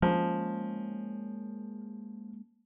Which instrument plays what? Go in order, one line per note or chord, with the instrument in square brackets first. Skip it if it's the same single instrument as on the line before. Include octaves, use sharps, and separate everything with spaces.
[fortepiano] F3 [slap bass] G#3 A#3 C#4